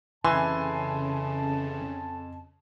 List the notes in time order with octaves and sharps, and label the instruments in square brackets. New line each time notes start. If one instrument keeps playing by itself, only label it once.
[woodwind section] F2 A5 [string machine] C#3 [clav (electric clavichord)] E3 [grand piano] G#5 C6